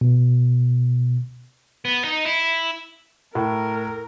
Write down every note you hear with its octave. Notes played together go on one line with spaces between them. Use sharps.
B2
B3
D#4
E4
A2 A#4